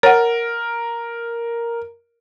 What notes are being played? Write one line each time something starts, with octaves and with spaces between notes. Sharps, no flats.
A#4 C#5 F#5